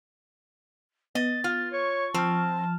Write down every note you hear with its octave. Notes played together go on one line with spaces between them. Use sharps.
B3 D#5 A6
F4
C#5 C#6
F3 C4 A5 F6